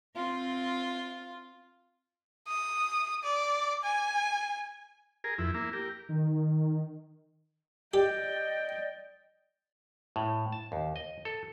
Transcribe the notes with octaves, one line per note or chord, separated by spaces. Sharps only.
C4 F4
D#6
D5
G#5
G#4 A#4
F2 E4
A#3 E4
G4 A#4
D#3
G4 D5 D#5 G5
A2
A5
D#2
D#5
A4